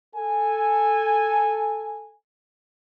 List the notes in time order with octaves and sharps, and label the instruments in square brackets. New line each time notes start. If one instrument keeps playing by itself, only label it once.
[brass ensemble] A4 G#5